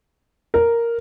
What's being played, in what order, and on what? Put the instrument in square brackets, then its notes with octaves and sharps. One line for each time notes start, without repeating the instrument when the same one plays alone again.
[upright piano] A#4